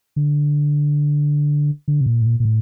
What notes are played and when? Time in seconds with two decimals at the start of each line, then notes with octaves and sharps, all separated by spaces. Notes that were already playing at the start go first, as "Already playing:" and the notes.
0.16 D3
1.88 D3
2.01 C3
2.06 A#2
2.21 A2
2.26 A#2
2.40 A#2
2.45 A2